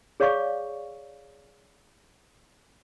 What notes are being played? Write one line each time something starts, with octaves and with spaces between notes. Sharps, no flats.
G#4 C#5 D5 F5 C#6